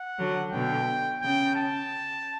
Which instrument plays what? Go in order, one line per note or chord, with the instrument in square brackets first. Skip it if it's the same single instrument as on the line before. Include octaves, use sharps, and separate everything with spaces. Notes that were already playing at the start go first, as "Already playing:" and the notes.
Already playing: [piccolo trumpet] F#5
[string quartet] D3 F#3
[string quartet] B2 D3 [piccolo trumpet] G5
[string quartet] C#3 [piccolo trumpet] G5
[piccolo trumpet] A5